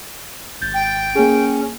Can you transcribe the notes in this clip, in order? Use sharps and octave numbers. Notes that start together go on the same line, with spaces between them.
G#1 G6 A6
G5
A#3 C#4 G#4